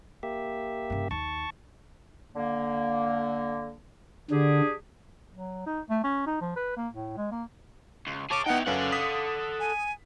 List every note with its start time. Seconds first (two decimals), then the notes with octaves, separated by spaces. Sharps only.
0.23 A#3 G4 E5
0.90 G2 C#3
1.11 D#2 A5 C#6
2.35 D3 A#3
4.31 D3 D4 G4 G#4
5.33 F#3
5.66 D#4
5.90 A3
6.04 C#4
6.26 D#4
6.41 F3
6.56 B4
6.77 A#3
6.93 A2
7.17 G#3
7.32 A#3
8.07 C#2
8.31 G#4 C#5 A5 D6
8.46 B3 D#4 E4 F#5 G5
8.67 F#2 C#4 A4 B4 F5 F#5
8.92 D#6 B6
9.60 G#5